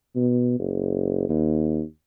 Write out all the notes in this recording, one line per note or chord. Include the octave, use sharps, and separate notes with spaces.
B2
F#1
D#2